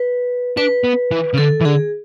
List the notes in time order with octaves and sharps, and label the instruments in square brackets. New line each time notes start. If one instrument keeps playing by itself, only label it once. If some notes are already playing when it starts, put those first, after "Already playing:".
Already playing: [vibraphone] B4
[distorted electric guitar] D4 [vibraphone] B4
[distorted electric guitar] B3
E3
C#3
[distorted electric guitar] D3 [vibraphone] A4
[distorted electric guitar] E3
[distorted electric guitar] D3 [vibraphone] G#4